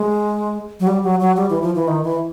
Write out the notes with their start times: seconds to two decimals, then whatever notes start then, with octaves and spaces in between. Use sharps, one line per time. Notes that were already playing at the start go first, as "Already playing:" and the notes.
Already playing: G#3
0.80 F#3
0.87 G3
1.04 F#3
1.20 F#3
1.37 G3
1.50 E3
1.62 F3
1.75 E3
1.88 D#3
2.04 E3